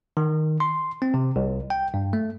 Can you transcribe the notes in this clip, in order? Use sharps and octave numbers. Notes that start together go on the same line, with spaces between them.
D#3
C6
C4
C3
C2
G5
G2
A3